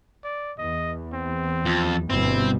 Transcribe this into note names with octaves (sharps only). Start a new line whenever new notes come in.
D5
E2 D#5
C4
F2
G1 B2 G3 C4 E4